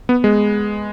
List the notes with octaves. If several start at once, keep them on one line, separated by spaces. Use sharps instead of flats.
B3
G#3